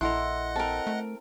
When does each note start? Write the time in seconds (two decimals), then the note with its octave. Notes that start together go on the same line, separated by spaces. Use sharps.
0.01 A#1 E4 A4 A#4 D#5 F#5 C6 F#6
0.56 C4 A4 A#4
0.87 A3